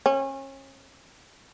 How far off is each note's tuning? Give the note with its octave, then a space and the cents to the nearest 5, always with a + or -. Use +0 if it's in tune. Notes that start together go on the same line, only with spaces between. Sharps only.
C#4 -35